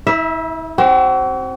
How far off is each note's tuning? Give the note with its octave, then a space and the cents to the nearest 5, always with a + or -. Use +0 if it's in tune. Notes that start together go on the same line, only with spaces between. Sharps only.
E4 -40 E5 +0
C4 +15 F#4 +40